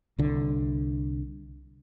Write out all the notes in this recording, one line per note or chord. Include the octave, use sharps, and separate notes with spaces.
C2 D3